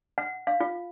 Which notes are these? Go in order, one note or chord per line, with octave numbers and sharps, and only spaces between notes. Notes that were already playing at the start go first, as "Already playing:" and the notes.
F#5
F5
F4